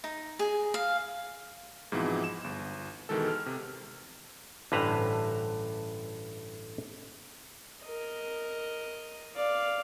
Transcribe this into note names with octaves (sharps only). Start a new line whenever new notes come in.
D#4
G#4
F5
G#2 B2 E3 F3 C4 E4
E7
G1
B2 D#3 E3 G#3 A4
F6
C3
A1 G2 D3 B4 C5 A#5
A#4 D#5
D5 F5